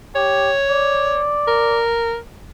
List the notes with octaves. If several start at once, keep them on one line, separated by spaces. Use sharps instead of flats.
G4 C#5
D5
A#4